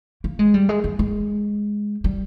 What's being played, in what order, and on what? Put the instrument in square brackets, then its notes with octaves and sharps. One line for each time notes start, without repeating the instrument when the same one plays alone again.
[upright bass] A#3
G#3
G3
G#3
A#3
G#3
G3